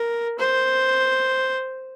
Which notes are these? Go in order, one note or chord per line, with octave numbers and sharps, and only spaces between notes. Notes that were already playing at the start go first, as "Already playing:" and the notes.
Already playing: A#4
C5